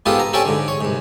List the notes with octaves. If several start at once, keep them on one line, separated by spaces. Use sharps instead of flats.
G#2 B3 F4 G4 A4 D#6
A#5
C4 C#4 G4 A4 D5 G#5
G#2 D3
C#5
C2 G#2